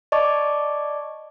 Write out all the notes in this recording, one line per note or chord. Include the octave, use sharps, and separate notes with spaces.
D5 D#5 A5 C#6 D6